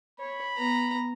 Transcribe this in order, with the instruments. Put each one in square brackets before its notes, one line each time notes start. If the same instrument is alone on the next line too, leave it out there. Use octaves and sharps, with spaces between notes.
[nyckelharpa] C#5 [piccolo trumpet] B5
[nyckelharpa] B3 A#5